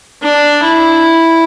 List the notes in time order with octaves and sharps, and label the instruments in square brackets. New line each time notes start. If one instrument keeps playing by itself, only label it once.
[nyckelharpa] D4
E4